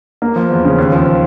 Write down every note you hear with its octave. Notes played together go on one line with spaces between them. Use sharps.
A#3
F3
E2
C#3
D#2
F3